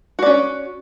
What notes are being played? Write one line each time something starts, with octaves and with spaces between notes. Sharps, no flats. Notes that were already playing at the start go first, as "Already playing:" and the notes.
C#4 F#4 D5